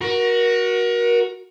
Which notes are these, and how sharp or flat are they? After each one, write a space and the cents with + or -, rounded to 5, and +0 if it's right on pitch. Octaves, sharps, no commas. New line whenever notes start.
F#4 +0 A#4 +30